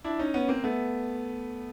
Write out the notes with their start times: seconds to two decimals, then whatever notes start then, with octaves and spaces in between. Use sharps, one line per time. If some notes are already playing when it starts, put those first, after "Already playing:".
0.04 D4 E4
0.19 C#4 D#4
0.34 B3 C#4
0.48 A#3 C4
0.64 A3 B3